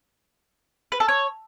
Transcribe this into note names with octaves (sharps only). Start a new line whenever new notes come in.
B4
A4
C#5